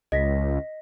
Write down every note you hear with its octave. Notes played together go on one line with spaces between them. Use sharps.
C#2 D#5 A#6 B6